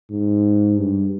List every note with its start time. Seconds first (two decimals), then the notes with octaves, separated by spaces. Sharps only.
0.11 G#2
0.77 G2